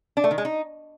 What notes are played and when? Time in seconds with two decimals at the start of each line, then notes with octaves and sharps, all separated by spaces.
0.17 D4
0.24 A3
0.31 D#3
0.38 G#3
0.45 D#4